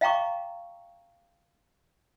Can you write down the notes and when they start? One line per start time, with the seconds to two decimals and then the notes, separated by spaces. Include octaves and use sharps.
0.01 D#5 F5 G5 A#5 C#6 D6